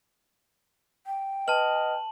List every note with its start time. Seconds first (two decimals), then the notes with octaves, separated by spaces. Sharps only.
1.07 G5
1.48 B4 D#5 A5 F6 F#7